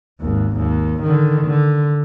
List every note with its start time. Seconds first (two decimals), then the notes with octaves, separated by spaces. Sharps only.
0.20 G#1 D#2
0.58 D#2
1.03 D3 D#3
1.46 D3